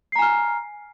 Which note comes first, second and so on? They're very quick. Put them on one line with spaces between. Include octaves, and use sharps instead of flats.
C7 A#5 G#5 F6